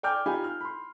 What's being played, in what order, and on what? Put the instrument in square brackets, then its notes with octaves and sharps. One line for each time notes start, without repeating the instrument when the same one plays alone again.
[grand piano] D5 G5 G#5 D6 F6 G6
D#4 F4 G4 F5 G#5 B5
F6
B5 C6